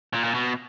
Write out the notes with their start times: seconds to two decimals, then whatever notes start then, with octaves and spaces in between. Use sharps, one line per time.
0.14 A#2
0.24 A#2
0.34 B2